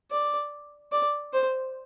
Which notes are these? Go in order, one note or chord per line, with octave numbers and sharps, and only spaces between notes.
D5
D5
C5